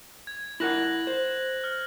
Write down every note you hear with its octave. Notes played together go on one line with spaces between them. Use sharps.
G#6
E4 A#4 F#5 F#6 A#6 F#7
C5
F6